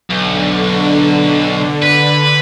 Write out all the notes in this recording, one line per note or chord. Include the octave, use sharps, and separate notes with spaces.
B1 D3
B4